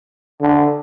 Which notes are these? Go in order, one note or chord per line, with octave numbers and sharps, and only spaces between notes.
D3